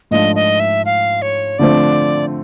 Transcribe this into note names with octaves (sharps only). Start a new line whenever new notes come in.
G#2 F3 A3 D4 F4 D#5
D#5
E5
F5
C#5
D3 F3 A3 C4 D5